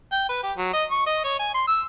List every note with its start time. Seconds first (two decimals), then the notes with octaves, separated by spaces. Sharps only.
0.12 G5
0.29 B4
0.43 G4
0.57 F#3
0.73 D#5
0.91 C#6
1.06 D#5
1.24 C#5
1.39 G#5
1.54 C6
1.68 E6